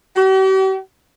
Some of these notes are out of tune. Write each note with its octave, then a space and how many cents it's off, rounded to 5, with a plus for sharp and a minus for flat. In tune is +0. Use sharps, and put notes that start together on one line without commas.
G4 -45